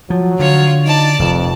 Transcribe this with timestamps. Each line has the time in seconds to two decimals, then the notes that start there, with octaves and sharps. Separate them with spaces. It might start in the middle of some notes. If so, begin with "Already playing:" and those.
0.10 F3 F#3
0.40 D3 F4 C#5
0.86 D#4 D5 A5
1.19 F1 F2